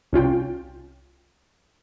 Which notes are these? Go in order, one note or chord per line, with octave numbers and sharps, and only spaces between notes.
C2 C#4 F4 G5